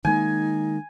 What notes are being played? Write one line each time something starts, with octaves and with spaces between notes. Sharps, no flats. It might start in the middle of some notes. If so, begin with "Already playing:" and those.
D#3 G#3 A#3 D#4 G#5